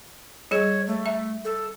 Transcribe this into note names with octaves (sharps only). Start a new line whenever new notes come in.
G3 G#4 C#5
A3
E5
A4